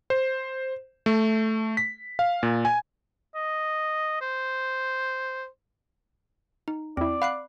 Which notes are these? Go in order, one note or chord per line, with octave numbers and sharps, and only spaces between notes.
C5
A3
B6
F5
A#2
G#5
D#5
C5
D#4
E2 C4 E4 D5
F5 F#5 B5 F#6 C7